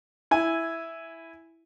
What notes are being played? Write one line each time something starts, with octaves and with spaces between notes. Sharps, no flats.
E4 G#5